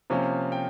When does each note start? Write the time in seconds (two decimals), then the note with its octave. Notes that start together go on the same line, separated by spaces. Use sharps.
0.10 C3 F3 A#3 C#4
0.52 G5